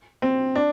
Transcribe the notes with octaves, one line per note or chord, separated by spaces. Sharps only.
C4
D4